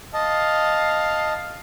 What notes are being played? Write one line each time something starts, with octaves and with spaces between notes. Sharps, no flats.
D#5 F5 A5